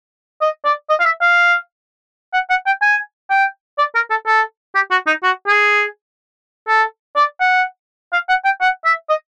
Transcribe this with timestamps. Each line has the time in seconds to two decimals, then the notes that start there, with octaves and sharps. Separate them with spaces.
0.41 D#5
0.65 D5
0.89 D#5
1.00 F5
1.05 E5
1.21 F5
2.33 F#5
2.50 F#5
2.66 G5
2.82 G#5
3.30 G5
3.78 D5
3.95 A#4
4.10 A4
4.26 A4
4.75 G4
4.91 F#4
5.07 D#4
5.23 F#4
5.47 G#4
6.68 A4
7.16 D5
7.40 F#5
8.13 F5
8.29 F#5
8.45 G5
8.61 F#5
8.85 E5
9.09 D#5